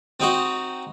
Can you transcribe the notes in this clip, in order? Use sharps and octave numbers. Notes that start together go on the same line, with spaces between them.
C4 D#4 F#4